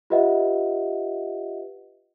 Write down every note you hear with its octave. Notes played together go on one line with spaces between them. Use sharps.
F4 G4 B4 D#5 E5 F#5